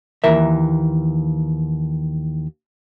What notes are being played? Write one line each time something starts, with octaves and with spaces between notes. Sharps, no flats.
D#2 E3 A#4 E5